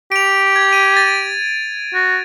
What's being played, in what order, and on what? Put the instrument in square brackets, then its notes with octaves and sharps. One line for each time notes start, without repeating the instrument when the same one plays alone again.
[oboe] G4 [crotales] D7 F7
[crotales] G#6
D#7
A6
[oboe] F#4